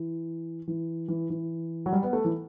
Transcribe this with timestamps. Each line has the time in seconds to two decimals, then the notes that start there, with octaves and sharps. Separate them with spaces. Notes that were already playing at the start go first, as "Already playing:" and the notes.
Already playing: E3
0.68 E3
1.08 E3
1.30 E3
1.86 F#3
1.93 G3
2.03 B3
2.13 A3
2.25 E3